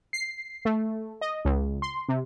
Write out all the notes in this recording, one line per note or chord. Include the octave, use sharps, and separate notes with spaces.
C7
A3
D#5
C#2
C6
C3